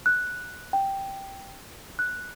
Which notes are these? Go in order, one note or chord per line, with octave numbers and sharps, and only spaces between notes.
F#6
G5
F#6